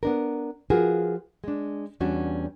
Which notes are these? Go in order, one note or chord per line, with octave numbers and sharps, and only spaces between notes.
B3 D4 A#4
F3 F4 F#4 G#4 A#4 B4
G#3 D4
E2 G3 C#4 D4 F#4